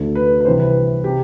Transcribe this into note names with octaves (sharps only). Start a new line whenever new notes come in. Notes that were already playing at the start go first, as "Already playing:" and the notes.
Already playing: D2 D3
B4
B4
C2 C3 E3 C5
B4
C3 G4